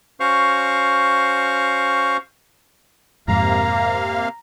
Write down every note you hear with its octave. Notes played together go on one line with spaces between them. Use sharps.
C#4 F#4 C5 F5 C#6 F6
F2 G#2 C3 A#3 F5 A#5